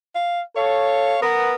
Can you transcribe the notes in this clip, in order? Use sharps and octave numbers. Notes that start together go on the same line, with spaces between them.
F5
A4 C#5 F5
B3 A#4